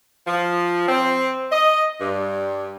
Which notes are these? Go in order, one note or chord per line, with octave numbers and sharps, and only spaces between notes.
F3
C4
D#5
G2